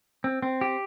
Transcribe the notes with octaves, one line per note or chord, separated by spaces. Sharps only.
C4
C4
G4